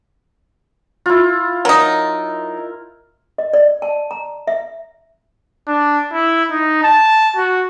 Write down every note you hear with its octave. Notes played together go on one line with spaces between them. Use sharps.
E4 F4
F#3 D#4 A#4
D#5
D5
A5
A#5
E5
D4
E4
D#4
A5
F#4